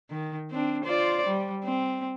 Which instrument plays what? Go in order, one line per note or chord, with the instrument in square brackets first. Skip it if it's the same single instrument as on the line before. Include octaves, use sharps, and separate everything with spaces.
[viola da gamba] D#3
C4 D4
F4 C5 D5
G3
C4